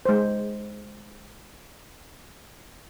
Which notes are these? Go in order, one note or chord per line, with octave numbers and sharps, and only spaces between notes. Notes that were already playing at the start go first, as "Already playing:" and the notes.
G#3 C5